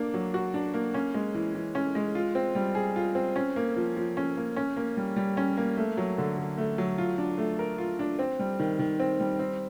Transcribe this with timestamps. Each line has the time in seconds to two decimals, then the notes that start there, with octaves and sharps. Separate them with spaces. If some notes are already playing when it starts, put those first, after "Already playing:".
Already playing: A#3 D4
0.14 F#3
0.34 F#4
0.54 D4
0.74 A#3
0.94 C#4
1.14 G#3
1.34 E3
1.55 E3
1.75 C#4
1.95 G#3
2.15 F4
2.35 C4
2.55 G3
2.75 G#4
2.96 F4
3.15 C4
3.36 C#4
3.56 A#3
3.76 F3
3.97 F3
4.17 C#4
4.37 A#3
4.56 C#4
4.76 A#3
4.97 G3
5.16 G3
5.37 C#4
5.57 A#3
5.77 A3
5.97 F#3
6.18 D3
6.38 D3
6.58 A3
6.78 F#3
6.98 F4
7.18 D4
7.38 A3
7.59 A#4
7.78 F4
7.99 D4
8.19 C4
8.39 G3
8.60 D#3
8.79 D#3
9.00 C4
9.20 G3
9.39 C4